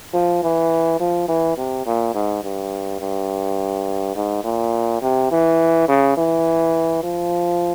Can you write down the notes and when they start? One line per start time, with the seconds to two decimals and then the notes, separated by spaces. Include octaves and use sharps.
0.13 F3
0.43 E3
1.00 F3
1.28 E3
1.57 C3
1.86 A#2
2.15 G#2
2.43 G2
3.01 G2
4.16 G#2
4.44 A#2
5.02 C3
5.31 E3
5.88 C#3
6.17 E3
7.03 F3